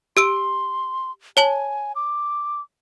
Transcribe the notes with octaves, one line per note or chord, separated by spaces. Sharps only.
G4 C6 E6 D7
C#5 G#5 A5 F#7
D6